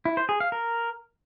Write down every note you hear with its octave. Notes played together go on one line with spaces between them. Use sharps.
E4
C5
G#4
F5
A#4